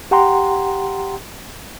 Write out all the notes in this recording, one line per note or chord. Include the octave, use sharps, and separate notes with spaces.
G4 F#5 G5 A#5 C6